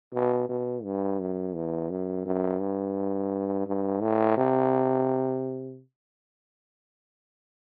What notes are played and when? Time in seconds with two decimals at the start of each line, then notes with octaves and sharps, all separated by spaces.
0.13 B2
0.49 B2
0.84 G2
1.20 F#2
1.55 E2
1.90 F#2
2.26 F#2
2.61 G2
3.66 G2
4.02 A2
4.37 C3